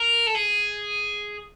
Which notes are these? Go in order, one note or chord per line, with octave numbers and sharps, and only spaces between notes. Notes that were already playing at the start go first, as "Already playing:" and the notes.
Already playing: A#4
A4
G#4